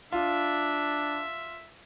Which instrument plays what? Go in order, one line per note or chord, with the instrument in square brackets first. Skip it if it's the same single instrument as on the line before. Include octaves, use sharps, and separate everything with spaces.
[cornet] D4 [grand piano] F4 [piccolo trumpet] E5